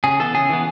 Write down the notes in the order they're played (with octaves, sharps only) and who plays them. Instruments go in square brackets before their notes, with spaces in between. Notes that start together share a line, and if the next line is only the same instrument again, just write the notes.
[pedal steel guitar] C#3 G#4
E3 B3 A4
C#3 G#4
E3 B3